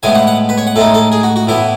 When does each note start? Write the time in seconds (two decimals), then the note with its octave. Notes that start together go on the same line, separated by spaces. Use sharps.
0.03 A2 G#3 B3 G#5
0.15 F#5
0.27 F#5
0.49 B4
0.58 C#5
0.67 F#5
0.76 A2 G#3 D#4 A4
0.94 A4
1.12 G#4
1.23 F#4
1.36 F#4
1.47 A2 E3 B3 E4